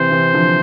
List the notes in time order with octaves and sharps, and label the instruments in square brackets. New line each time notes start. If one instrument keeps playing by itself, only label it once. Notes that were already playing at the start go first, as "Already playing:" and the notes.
Already playing: [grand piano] C3 E3 [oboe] C5
[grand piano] C3 E3
D3 F3